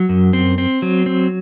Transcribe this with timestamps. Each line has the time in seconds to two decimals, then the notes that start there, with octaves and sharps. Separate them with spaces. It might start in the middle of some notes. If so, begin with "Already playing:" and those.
Already playing: F#3
0.09 F#2
0.33 C4
0.58 C4
0.82 F#3
1.06 C4